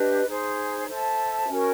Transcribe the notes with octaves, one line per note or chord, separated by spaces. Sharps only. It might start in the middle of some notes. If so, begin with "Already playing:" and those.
Already playing: D4 G4 B4 D#5
D#4 G#4 C5
A4 C5 E5 A5
C#4 F#4 A#4